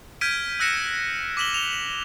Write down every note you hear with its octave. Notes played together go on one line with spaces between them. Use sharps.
F6 G6 G#6 B6 D7 D#7
E6 F#6 A#6 C#7 E7
D6 B6 E7 F#7 G7
F7 G7